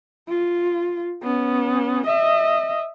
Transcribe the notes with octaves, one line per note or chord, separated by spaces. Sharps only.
F4
B3 C#4
D#5 E5